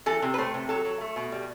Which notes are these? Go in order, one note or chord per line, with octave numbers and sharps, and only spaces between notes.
E3 A4
C3
B4
A3 C5
C3
F#3 A4
F#3
A3
B2
G3